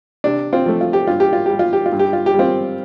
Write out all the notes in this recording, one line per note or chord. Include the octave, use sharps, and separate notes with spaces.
C3 D4
C4 F4
F3 A3
F4
G4
G2 F4
G4
F4
G3 G4
F4
G4
F4
G2
G4
F4
G4
G3 C4 F4